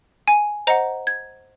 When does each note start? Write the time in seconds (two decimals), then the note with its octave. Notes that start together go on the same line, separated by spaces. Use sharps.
0.28 G#5
0.67 C5 D#5 F#5 A#5
1.07 G#6